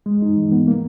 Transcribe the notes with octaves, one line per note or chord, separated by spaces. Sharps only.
G#3
D#4
E3
B3
A#3